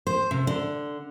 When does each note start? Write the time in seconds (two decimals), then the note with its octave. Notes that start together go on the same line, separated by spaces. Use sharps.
0.07 C5
0.31 C3
0.47 D3